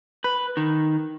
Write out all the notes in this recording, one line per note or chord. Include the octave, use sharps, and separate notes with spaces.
B4
D#3